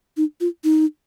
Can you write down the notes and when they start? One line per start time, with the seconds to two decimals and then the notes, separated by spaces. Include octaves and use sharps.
0.17 D#4
0.41 F4
0.64 D#4